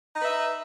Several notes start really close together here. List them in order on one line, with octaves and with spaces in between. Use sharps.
D#4 B4 E5